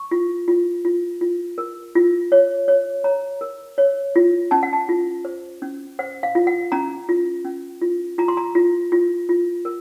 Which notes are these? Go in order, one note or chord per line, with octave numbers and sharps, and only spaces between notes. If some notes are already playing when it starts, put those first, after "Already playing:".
Already playing: C#6
F4
F4
F4
F4
A#4
F4
C#5
C#5
C#5 A#5
A#4
C#5
F4
C#4 A5
F#5
A5
F4
C5
C#4
C5 F#5
F5
F4
F#5
C#4 A#5
F4
C#4
F4
F4 A#5
C6
A#5
F4
F4
F4
A#4